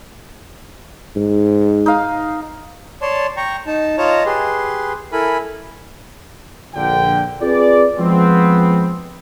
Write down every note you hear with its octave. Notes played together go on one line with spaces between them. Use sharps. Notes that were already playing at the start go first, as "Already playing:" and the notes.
G#2
D#4 F5
C#5 D5 A5 C6
G5 A#5 C#6
D#4 A5
F4 C#5 D#5 A5 A#5
G4 G#4 B4 C6
E4 A4 A#4 G#5 B5
A#1 D3 G5
C4 F4 G#4 B4 D5
F3 G#3 B3 C4